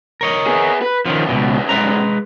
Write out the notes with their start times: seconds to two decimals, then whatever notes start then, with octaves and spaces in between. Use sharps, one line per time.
0.21 A#4 C#5 D#5
0.47 B3 G#4
0.82 B4
1.05 E2 D#3 F3 C#4
1.29 C#2 G2 B2
1.69 G#3 B4 A#5